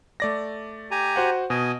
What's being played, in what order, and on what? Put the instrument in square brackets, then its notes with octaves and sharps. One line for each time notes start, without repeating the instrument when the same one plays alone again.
[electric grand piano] A3 D5 A#6
[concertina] G4 G#5 A#5
[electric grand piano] F#4 C5 F#5
[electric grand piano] B2 [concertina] D#5 G#5